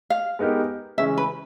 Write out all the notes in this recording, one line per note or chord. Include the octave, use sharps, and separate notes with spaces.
F5
G#3 B3 D#4 G4 A#4
C#3 E3 G#3 C#4 E5
B4